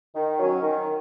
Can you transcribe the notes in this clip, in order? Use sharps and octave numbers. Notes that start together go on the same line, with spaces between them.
D#3
F#3 C#4
D#3